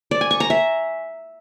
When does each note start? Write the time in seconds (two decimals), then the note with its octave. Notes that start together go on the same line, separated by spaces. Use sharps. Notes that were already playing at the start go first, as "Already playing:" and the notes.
0.11 D5
0.21 G#5
0.31 C#6
0.40 A#5
0.50 E5